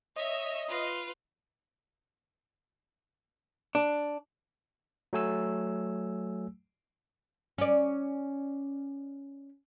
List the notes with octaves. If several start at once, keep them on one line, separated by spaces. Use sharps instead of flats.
C#5 D#5 E5
F4 B4
D4
F#3 A3 G#5 E6
C#4 D5